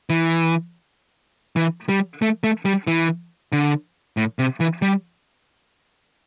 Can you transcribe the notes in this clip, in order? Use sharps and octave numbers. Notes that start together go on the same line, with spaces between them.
E3
E3
G3
A3
A3
G3
E3
D3
A2
C3
E3
G3